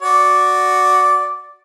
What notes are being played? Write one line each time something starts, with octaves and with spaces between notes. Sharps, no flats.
F#4 D5